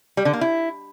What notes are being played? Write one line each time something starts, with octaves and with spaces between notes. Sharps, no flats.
G3
D3
A#3
E4